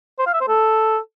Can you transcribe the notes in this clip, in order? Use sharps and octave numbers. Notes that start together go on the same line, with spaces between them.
C5
F5
E5
C5
A4